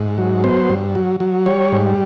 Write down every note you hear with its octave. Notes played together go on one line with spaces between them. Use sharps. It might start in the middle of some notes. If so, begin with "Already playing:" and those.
Already playing: G#2
F#3
B3 C5
G2
F#3
F#3
G3 C#5
G#2